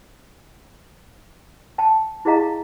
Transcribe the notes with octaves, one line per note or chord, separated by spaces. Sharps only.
G5 A5
E4 G4 G#4 D#5 F5 A#5